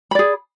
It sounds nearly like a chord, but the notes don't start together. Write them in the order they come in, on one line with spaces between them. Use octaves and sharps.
B5 D5 G#4